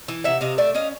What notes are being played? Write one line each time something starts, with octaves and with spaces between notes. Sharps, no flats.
E3
C3 E5 F#5
C3 D#5 F5
A3 D5 E5
C#4 D#5 F5